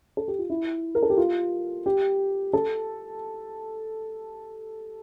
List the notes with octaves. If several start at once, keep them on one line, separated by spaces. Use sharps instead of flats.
A4
G4
F4
E4
A#4
A4
G4
F4
G4
A4